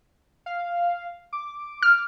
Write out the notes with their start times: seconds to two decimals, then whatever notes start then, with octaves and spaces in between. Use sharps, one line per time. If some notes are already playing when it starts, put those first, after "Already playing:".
0.46 F5
1.33 D6
1.82 F6